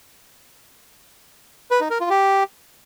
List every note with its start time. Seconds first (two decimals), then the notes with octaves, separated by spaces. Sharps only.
1.71 B4
1.81 D#4
1.90 A#4
2.00 F4
2.10 G4